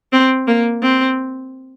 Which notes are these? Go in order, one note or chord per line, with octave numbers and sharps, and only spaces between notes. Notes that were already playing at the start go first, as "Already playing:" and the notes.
C4
A#3
C4